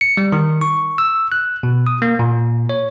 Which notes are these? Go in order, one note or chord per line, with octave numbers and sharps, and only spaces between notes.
C#7
G3
D#3
C#6
E6
F#6
B2
D#6
A#3
A#2
C#5